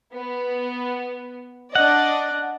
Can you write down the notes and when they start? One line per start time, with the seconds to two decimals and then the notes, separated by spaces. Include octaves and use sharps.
0.14 B3
1.75 D4 D5 D#5 F#5